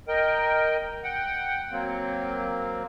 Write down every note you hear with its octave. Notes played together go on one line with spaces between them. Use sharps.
A#4 D#5 G5
F#5 G5
F#3 A#3 C4